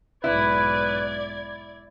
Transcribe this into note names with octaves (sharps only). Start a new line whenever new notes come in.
B1 G#2 E4 B4 D5 G#6